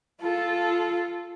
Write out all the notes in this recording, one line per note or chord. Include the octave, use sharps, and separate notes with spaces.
F4 A4